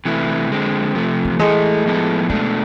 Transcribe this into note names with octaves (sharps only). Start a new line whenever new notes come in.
C3 E3 A3 E4
D3 G#3 C4
C3 F3 A3
E3
E3 G#3 A3 E4 A4
A2 F3 B3 E4 A4
B2 G#3 A3 D4